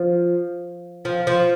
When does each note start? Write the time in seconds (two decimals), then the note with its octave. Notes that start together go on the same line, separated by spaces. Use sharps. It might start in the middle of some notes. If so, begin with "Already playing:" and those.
Already playing: F3
1.05 F3
1.27 F3